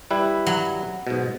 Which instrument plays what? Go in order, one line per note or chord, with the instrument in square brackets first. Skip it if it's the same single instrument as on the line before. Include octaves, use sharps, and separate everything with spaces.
[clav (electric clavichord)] G3 E4 B4
[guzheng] F#3
[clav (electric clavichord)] G#2 B2